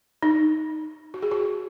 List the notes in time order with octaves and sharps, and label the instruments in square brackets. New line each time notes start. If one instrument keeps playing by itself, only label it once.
[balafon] D#4
F#4
G#4
F#4